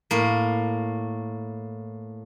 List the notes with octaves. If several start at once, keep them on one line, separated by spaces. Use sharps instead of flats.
A2 A#3